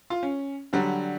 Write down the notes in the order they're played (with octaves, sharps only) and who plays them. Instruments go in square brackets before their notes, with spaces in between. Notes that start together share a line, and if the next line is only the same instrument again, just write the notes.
[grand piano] F4
C#4
D3 F#3 G3